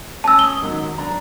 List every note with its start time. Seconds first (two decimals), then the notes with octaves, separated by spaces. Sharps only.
0.24 C#4 A5 E6
0.39 D#6 G7
0.61 G#2 D#3 F#3
0.98 D4 A#5